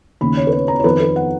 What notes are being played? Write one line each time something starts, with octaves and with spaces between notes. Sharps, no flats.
D#2 C#3 B5
C#5
B4
C#5
A#5
C#5
F2 D#3 B4
B4
F#5